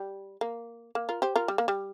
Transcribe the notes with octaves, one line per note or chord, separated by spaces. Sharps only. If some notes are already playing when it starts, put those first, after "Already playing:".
Already playing: G3
A#3
A#3
F4 A#4
G4 C5
F4 A#4
G3
A#3
G3